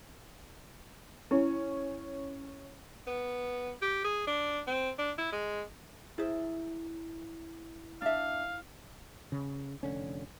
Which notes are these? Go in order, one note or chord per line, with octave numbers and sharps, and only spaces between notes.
C#4 E4
B3
G4
G#4
D4
C4
D4
E4
G#3
E4 G#4 C5 E5
D4 E5 F5
C#3
F1 D3 C#4